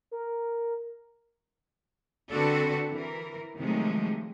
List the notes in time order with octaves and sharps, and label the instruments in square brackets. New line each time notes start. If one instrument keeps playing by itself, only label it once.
[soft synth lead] A#4
[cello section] D3 C4 D4 F#4 A4 B4
E3 A#4
C3 D#3 F3 F#3 G#3 A3